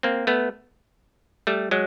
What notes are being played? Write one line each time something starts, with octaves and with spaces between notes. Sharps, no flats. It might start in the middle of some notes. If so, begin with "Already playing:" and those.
A#3 C4
A3 B3
G3 A3
F#3 G#3